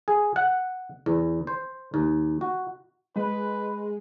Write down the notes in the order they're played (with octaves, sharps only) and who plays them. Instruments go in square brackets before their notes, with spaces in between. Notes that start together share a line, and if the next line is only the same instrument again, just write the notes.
[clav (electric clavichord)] G#4
F#5
E2
C5
D#2
F#4
[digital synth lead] G#3 [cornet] B4